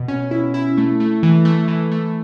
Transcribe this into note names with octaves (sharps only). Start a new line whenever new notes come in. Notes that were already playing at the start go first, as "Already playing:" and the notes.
Already playing: B2
C#4
E4
E4
A3
A3
E3
A3
E3
A3